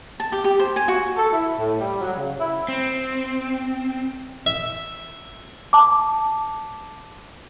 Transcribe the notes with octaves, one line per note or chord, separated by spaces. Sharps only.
A5
G4
G4
C5
G#5
F#4
A4
E4
A2
G3
F#3
C#3
E4
C4
E5
A5 D6